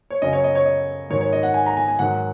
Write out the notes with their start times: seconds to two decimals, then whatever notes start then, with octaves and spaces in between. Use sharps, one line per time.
0.10 C#5
0.22 F#2 C#3 F#3 D#5
0.33 C#5
0.44 D#5
0.55 C#5
0.66 D#5
1.10 G#2 D#3 F#3 C#5
1.21 C#5
1.33 D#5
1.43 F#5
1.54 G#5
1.66 A#5
1.77 G#5
1.88 G#5
1.99 G#2 D#3 F#3 F#5